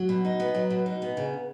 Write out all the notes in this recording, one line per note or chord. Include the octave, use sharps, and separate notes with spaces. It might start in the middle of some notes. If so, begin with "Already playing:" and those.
Already playing: F#3
B2
D#4
B3
F#3
B2
D#4
B3
C#3